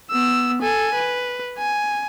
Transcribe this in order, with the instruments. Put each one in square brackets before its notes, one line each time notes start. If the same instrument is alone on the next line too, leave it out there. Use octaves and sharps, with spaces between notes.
[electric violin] B3 E6
A4 G#5
B4
G#5